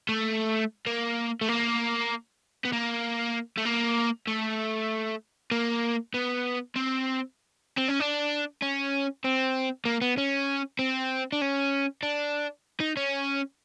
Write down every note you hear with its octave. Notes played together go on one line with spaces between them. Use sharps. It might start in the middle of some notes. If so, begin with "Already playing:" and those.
A3
A#3
A3
A#3
B3
A#3
A3
A#3
A3
A#3
B3
C4
C4
C#4
D4
C#4
C4
A#3
B3
C#4
C4
D4
C#4
D4
D#4
C#4